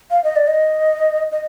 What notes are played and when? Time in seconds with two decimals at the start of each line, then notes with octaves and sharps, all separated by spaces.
0.11 F5
0.24 D#5
0.36 D5
0.48 D#5
1.32 D#5